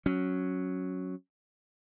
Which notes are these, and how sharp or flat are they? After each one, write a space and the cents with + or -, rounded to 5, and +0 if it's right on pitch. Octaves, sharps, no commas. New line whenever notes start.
F#3 -5 C#4 +0